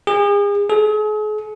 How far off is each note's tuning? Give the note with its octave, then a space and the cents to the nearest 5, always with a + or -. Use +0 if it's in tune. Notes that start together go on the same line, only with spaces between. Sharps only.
G#4 -40
G#4 +40